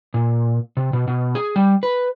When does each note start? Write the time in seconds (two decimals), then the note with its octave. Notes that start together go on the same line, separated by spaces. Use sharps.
0.14 A#2
0.77 C3
0.93 B2
1.08 B2
1.35 G#4
1.56 G3
1.83 B4